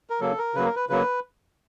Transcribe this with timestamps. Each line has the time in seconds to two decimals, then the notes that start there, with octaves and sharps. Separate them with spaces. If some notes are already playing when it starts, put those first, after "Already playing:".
0.10 A#4
0.21 C#3 F#3 A#3 A4
0.38 A#4
0.54 C#3 F#3 A#3 B4
0.65 A#4
0.76 B4
0.89 C#3 F#3 A#3 B4